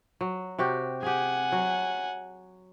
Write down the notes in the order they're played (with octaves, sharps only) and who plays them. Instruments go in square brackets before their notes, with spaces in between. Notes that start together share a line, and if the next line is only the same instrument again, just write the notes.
[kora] F#3
C3 F#4 G4
[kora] G4 G#4 [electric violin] F#5 G#5
[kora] F#3